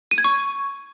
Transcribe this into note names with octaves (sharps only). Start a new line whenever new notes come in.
D#7
G#6
C#6